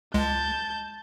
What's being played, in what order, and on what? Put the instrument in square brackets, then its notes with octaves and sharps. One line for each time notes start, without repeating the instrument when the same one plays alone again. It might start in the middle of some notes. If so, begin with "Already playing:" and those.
[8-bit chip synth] C#2 G#3 [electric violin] A5 G6